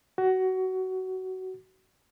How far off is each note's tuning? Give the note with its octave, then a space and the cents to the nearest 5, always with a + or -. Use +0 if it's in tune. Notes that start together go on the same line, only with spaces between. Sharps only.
F#4 +20